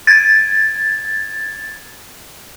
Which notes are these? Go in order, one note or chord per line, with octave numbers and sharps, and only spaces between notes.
G#6 A6